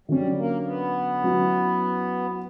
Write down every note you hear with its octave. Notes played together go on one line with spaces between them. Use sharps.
D3 F#3 G3 C#4
A#3
B3
F#3 C#4 E4